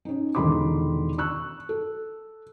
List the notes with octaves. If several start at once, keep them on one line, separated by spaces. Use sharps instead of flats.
C#4 D#4
E1 D3 D#3 B5 C6 D6
C#6 E6 F#6
A4